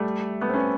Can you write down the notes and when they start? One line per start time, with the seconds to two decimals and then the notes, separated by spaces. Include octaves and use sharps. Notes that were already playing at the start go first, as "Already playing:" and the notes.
Already playing: G3 A3
0.41 A3 B3
0.49 C4
0.54 B3 C#4